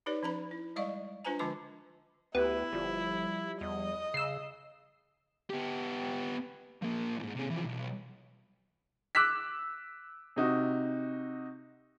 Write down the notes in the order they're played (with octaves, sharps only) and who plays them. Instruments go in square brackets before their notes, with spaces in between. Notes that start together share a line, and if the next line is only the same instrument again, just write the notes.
[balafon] D#4 G4 B4 C#5 D5
F3 C#4 A#5 B5
E4
G3 G#3 D5 D#5 F5 C#6
D4 F4 B4 C5 G#5 A#5
D3 F3 G#3 F4 A5 D6
[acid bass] D2 [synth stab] B3 [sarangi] E4 [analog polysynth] G4
[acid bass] G1 [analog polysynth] F3 G3
[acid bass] E2 [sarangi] D#5
[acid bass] C#3 [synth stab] E6 C7
[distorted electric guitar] B3 G4
F3 A#3
E2 G#2
C3 G#4
E3 F3
B1
[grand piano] D6 E6 F#6 B6
C3 D#4 F#4